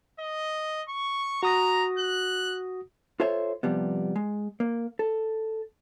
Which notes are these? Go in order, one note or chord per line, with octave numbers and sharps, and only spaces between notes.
D#5
C#6
F#4 A#5 D#6 A#6
F#6
F4 A4 C5 C#5 E5
C3 F3 G3 B3
G#3
A#3
A4